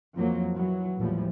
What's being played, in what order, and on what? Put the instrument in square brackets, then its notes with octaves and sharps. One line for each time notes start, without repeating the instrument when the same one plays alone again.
[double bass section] F2 F3 F#3 A#3
E3 F#3
A1 D#2 A2 E3 F3 G3